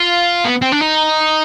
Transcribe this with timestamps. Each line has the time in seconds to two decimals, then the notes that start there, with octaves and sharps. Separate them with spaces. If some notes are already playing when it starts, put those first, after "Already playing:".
Already playing: F4
0.45 B3
0.62 C4
0.72 D4
0.81 D#4